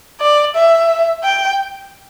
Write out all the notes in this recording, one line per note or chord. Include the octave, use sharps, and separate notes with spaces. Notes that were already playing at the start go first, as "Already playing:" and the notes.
D5
E5
G5